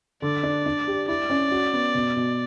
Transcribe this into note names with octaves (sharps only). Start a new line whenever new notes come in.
D3 D5
D4
D4
G4
E4 D5
C#4
F#4
B3
B2
B2